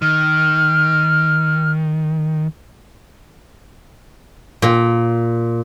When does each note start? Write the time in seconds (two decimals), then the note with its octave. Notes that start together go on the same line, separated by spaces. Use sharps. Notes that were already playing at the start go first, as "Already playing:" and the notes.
0.02 D#3 F6
4.62 A#2